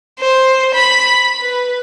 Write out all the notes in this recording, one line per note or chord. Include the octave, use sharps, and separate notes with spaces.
C5
B5
B4